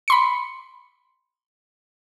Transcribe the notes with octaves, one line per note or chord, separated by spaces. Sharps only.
B5 C6 C#7